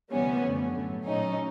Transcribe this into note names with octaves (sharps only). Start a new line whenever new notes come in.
D2 C3 E3 G3 B3 C#4
F#2 D3 F3 A3
A2 F#3 A3
A#2 F#3 A3 C#4 D#4